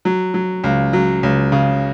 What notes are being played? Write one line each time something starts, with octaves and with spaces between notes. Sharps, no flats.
F#3
F#3
C#2
F#3
C#2
C#3